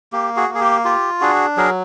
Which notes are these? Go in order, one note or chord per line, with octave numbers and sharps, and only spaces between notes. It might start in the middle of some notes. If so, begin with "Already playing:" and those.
A#3 G4
F#4 G#4
A#3
G#4
G4
F4 G4
D4 F#4 G#4
F#3 G#4 A#4